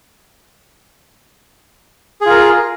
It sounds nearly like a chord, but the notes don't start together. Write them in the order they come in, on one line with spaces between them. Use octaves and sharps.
G#4 F4 A#4